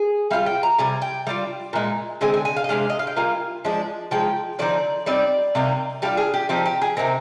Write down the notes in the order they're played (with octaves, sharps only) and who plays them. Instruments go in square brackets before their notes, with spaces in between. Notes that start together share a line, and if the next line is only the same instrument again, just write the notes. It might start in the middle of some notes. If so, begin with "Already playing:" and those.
Already playing: [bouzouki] G#4
G3 D4 F4 F5
G5
A#5
C3 G3 G#5
G5
G3 D4 F4
A#2 G#3 D#4
D3 G#3 C4 G#5
G#5
G#5
F5
D#5
C3 D#3 G#3 D4 F5
D#5
F5
G5
G3 A#3 F4 G#5
F3 G#3 D4
F3 G#3 D#4 G5
D3 F3 C4 D#4 D5
G3 C4 D#4 D5
C3 G3 A#3 D#4
G3 D4 F4 G4
G#4
G4
F3 C4 D#4 G4
G4
G#4
C3 G3 C4 D#4 A#4